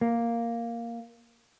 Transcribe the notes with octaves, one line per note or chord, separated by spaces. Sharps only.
A#3